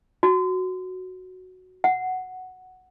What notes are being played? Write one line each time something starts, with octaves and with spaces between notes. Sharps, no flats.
F#4
F#5